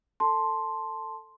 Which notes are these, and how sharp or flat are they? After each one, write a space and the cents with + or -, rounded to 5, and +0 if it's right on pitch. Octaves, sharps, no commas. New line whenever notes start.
A4 +20 A5 +0 C6 +0